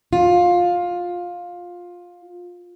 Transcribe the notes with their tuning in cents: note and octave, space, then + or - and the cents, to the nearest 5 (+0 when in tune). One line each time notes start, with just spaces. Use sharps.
F4 +15